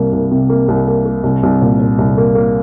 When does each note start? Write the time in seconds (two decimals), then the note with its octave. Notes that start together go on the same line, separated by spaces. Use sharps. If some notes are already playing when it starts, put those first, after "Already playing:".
Already playing: C2 A#3
0.13 C2
0.32 C3
0.49 A#3
0.68 C2
0.87 A#3
1.06 A#3
1.23 C2
1.43 C2
1.62 A#2
1.80 A#2
1.98 C2
2.18 A#3
2.35 A#3